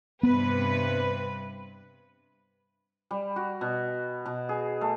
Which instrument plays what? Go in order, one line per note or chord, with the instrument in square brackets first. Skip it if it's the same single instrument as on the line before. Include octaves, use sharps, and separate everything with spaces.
[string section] G2 C3 B4 [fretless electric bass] B3
[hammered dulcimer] G3
F#4
B2
B2
G#4
A3